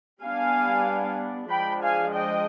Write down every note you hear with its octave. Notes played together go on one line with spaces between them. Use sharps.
G3 B3 D4 F5 G#5
F3 G#3 D4 G5 B5
F5 G#5
D#5 G5